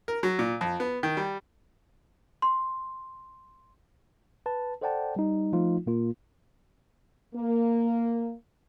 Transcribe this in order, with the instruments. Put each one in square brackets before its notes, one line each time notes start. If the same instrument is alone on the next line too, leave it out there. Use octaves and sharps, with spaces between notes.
[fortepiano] A#4
F#3
A#2
F2
B3
D#3
G3
[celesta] C6
[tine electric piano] B4 A5
A4 C5 D5 F#5 G5 A5
G3 D#4
F3 A3 D#4 F4
A#2 A#3 F4
[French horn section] A#3